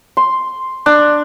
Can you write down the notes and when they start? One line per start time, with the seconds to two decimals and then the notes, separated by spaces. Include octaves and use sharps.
0.17 C6
0.86 D4